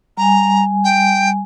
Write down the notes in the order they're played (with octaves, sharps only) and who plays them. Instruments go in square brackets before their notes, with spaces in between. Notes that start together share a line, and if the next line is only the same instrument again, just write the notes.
[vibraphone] G3 G#5 [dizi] A#5
[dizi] G5